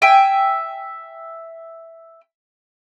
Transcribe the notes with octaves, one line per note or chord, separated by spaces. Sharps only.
E5 G5 G#5